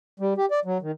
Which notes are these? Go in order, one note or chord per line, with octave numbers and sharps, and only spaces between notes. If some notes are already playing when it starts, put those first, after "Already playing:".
G3
G4
D5
F#3
D#3